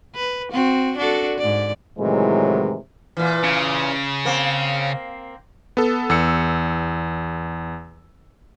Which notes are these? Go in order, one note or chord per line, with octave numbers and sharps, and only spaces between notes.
B4
C4 F#4
D4 F#4 A4
G#2 D5
A2 C3 D#3 E3 F#3 G#3
A#2 E3
C#3
A#3 C4
B3 A4
E2 E6 C#7